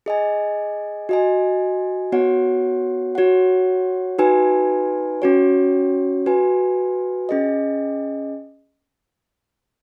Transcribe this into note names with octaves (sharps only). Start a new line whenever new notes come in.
G#4 D#5 G#5
F#4 D#5 G#5
B3 F#4 C#5 F#5
F#4 C#5 F#5
D#4 F#4 B4 G#5
C#4 F#4 C#5
F#4 B4 G#5
C#4 G#4 D#5